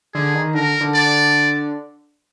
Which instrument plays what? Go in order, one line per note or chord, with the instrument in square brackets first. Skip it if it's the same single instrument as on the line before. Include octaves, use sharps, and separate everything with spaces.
[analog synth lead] D3 [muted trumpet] G#4
[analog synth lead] D#3
[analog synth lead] D3 [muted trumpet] A#4
[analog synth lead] D3
[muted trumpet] D5